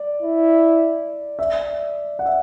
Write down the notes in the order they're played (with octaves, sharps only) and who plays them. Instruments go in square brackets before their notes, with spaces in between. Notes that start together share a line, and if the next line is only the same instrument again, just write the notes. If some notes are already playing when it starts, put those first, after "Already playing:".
Already playing: [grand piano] D5
[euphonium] E4
[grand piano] E5
F#5
E5